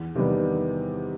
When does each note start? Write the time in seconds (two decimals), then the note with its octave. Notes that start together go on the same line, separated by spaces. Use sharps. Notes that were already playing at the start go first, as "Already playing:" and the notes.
Already playing: E2
0.15 C3 D#3 G3 B3